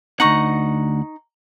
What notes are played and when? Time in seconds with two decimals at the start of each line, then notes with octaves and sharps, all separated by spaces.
0.20 D2 D#4 F#5 A#5 C#6